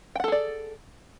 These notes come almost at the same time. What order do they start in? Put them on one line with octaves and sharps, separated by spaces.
G5 F#5 A4 G#4 D5